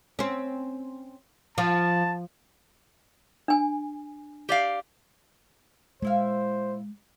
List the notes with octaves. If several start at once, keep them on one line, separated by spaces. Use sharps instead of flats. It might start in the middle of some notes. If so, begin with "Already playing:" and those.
C4 C#4
F3 A5
D4 G#5
G4 D5 F5
A#2 G#3 E4 C5 F5